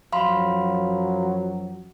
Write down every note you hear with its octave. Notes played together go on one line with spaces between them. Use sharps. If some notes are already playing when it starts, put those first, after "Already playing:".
F#2 F3 F#3 F5 B5 C6